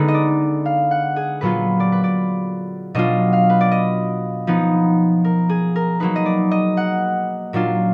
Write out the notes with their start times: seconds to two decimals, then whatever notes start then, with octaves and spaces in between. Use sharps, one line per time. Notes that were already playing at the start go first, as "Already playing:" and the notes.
Already playing: D3 G#3 B3 D#4 B4
0.08 D#5
0.14 D5
0.65 F5
0.91 F#5
1.16 G#4
1.41 A#2 F#3 B3 F4 B4
1.80 D5
1.92 B4
2.04 D5
2.95 B2 F#3 D4 F4 D#5
3.33 F5
3.50 B4
3.61 D5
3.72 D#5
4.47 F3 B3 D#4
5.24 A#4
5.49 G#4
5.76 A#4
6.00 F#3 A#3 D#4 B4
6.16 D#5
6.26 D5
6.51 D#5
6.77 F#5
7.53 A#2 F#3 D4 F4